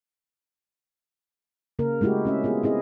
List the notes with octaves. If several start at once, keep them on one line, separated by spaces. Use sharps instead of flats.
C#3 A#3 A#4
G#3 A3 E4 F#4 G4
C4 C#4 E5
B3 F4 G#4
C4 E4 G#4 D#5